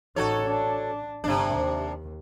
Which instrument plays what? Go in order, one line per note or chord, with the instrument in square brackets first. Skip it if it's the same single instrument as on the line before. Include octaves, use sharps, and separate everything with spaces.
[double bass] A1 D#4 [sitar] F#4 A4 C#5
[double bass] D4
[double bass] G1 [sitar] C3 D4
[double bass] D#2